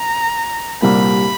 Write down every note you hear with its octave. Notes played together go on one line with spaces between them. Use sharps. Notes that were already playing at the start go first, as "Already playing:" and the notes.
Already playing: A#5
C2 A#2 G3 A#3 B5